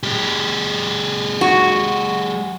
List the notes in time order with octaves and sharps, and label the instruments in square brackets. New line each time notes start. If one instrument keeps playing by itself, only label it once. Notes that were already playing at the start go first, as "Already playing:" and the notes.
[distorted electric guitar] G#3 G4
[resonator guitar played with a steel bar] F#4